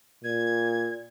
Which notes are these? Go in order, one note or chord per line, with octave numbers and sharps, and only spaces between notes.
A#2 G#6